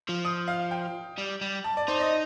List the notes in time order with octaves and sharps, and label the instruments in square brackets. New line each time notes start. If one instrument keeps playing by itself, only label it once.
[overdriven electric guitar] F3
[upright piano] D#6
F5
G5
[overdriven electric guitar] G3
G3
[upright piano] A5
D5
[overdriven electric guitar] D#4 [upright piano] C5
[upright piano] D#5